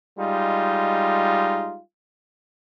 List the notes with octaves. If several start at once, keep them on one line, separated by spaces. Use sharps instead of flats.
G3 G#3 D#4 F4